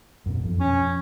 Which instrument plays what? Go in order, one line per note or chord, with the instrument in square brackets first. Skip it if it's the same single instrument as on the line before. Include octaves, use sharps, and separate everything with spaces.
[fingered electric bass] F#2 B2
F2 F3
[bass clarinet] C#4